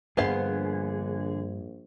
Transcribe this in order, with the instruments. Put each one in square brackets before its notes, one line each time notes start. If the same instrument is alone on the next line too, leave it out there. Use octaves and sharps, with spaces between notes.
[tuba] A#1 [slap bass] G2 G3 [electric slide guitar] D3 G#4 [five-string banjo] B3 C5 F5